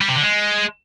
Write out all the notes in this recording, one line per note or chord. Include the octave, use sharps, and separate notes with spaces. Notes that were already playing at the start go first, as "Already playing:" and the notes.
G3
C3
D3
G#3